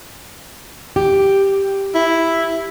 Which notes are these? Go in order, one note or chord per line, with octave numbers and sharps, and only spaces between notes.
G4
E4